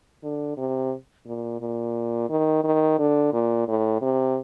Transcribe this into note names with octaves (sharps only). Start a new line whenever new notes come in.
D3
C3
A#2
A#2
D#3
D#3
D3
A#2
A2
C3